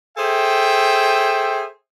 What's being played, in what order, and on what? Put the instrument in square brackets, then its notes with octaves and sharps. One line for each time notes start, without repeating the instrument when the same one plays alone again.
[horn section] G#4 A4 C5 E5 G5